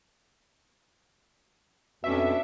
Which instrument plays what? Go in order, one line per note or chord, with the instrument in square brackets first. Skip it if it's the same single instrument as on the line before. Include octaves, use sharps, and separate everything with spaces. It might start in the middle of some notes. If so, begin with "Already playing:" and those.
[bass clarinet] F2 [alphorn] B2 [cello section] C#4 D4 [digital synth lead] E5